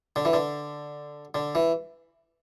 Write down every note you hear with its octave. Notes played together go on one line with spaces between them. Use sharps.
D3
E3
D3
D3
E3